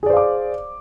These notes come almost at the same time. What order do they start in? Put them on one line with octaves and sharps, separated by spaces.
G#4 D5 C5 F5 D6